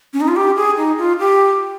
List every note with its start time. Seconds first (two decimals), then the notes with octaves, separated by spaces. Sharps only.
0.13 C#4
0.21 D#4
0.28 F4
0.36 G4
0.56 G#4
0.77 D#4
0.98 F4
1.19 G4